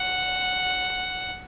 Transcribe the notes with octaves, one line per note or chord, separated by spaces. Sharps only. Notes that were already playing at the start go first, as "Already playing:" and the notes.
Already playing: F#5